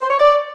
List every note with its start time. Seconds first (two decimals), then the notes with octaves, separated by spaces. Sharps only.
0.01 C5
0.10 C#5
0.19 D5